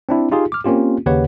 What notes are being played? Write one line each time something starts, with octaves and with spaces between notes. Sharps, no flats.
C4 D4 E4
D#4 F4 G4 G#4
D6 F6
A#3 C4 C#4 F4 G4
D#2 C#3 G4 B4 C#5 F#5